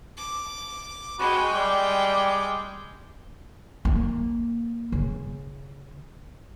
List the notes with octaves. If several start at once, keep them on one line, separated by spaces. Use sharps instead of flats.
D6
G#3 F#4 G5 B5
G3 D6
A#3
C#3